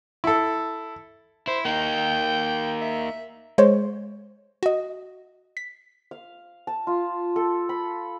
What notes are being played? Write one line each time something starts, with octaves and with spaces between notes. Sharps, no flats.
E4 A4
E4 C5
A#3 D#4 G5
E5
G#3 C5 C#5
F#4 D#5
B6
F5
A5
F4
A4
B5